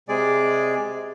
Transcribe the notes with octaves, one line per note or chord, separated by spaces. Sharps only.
C3 G#3 G#4 D5